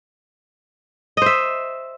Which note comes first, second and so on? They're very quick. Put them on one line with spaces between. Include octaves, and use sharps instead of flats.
D#5 C5 E5